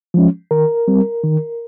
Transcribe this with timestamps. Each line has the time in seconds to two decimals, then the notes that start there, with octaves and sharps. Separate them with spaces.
0.14 F3 G#3 C#4
0.51 D#3 A#4
0.88 G3 C4
1.23 D#3